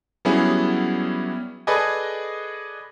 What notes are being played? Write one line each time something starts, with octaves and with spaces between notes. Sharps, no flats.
F#3 G3 B3 C#4 E4 G#4
G#4 A4 B4 D5 D#5 G#5